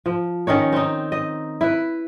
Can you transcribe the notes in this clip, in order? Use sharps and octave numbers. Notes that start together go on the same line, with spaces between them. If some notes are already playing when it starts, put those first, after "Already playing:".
F3
D#3 C#4 D#4 C#5
C4 D#4
D#5
E4 B4